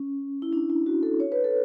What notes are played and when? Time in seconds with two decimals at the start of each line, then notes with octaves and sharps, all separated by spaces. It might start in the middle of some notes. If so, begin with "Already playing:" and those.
Already playing: C#4
0.42 E4
0.53 D4
0.70 E4
0.86 F#4
1.03 A4
1.20 C#5
1.32 B4
1.44 A4